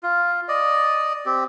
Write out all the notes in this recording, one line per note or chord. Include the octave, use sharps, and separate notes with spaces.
F4
D5 D#5
C4 G4